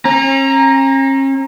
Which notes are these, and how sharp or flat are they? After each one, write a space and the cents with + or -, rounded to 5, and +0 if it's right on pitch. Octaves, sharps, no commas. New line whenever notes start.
C#4 -40 A#5 +0